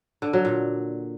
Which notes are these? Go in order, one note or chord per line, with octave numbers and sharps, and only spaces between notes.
D3
F#3
A#2